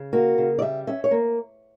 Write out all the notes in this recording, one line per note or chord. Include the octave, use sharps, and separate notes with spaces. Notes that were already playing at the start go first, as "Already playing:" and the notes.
Already playing: C#3
A#3 F#4
C#3
D5
G3 E5
C#4 E5
C#5
A#3